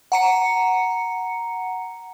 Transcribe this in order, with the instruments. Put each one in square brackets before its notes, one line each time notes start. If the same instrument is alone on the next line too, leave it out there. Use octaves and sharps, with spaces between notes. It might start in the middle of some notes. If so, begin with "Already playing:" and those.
[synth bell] F#5 A#5 C#7